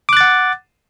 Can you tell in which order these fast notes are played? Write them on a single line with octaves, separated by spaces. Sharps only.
D6 F#6 A6 F#5